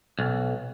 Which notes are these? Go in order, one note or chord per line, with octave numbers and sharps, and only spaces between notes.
B1